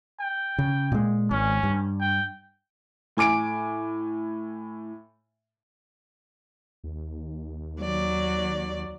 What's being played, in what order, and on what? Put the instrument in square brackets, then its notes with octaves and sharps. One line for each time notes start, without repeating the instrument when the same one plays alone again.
[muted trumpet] G5
[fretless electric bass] C#3
A#2 G#3
[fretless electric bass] G#1 [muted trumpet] C#4
[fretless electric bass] G2
[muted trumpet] G5
[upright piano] A2 G#5 D6 D7
[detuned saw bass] D#2
[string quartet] F#3 D5